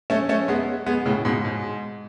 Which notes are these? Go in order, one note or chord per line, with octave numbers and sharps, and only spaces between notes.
A3 C#4
A3 C#4
G#3 B3
G#3 B3
A2 C#3
G#2 B2
G#2